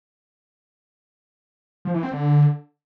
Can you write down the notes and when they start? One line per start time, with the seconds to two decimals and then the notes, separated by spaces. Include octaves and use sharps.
1.85 F3
1.94 E3
2.03 C4
2.12 D3